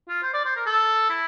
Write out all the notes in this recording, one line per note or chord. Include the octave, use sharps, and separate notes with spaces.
F4
C5
D5
C5
A#4
A4
E4